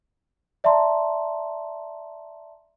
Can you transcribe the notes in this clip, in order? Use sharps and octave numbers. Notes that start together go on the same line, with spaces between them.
D5 E5 A5 A#5 C6